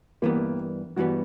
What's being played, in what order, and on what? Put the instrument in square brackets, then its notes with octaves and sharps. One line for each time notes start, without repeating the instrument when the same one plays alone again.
[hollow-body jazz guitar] G2 E3 G3 B3 [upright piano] A#3
[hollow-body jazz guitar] G2 E3 G3 B3 [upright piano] F#4